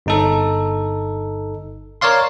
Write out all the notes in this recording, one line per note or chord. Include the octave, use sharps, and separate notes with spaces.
G1 D#4 A4
A#4 C#5 D5 F5 C6